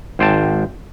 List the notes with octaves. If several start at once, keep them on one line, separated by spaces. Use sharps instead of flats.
G#1 C5 G5 A5